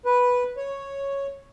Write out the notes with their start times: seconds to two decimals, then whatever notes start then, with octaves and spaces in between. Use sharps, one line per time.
0.06 B4
0.57 C#5